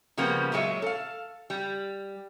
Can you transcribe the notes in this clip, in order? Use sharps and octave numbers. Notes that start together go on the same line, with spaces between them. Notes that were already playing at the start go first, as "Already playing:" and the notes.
C#3 F3 G3 A#3 B3
A#2 F#3 G#3 F#4 C#5 E5
A4 F5
G3